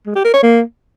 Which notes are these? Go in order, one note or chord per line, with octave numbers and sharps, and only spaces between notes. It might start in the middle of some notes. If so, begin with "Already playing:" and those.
G#3
G4
A#4
C#5
A#3